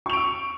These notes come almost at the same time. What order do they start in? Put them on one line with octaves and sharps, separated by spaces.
C#6 F7 D7 E6